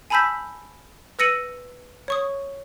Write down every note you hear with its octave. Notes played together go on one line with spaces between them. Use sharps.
G#5 A5 B5 E6 G6 B6
B4 E6 A#6 C#7 D#7 F#7
C#5 C#6 D#6